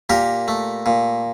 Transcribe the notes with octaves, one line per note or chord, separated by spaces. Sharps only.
A#2 G4 A#4
A3
A#2